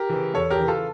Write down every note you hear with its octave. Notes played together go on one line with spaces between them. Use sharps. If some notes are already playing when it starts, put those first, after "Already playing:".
Already playing: G4 A#4
C#3 E3
E2 A4 C#5
G4 A#4
C#3 E3
F4 A4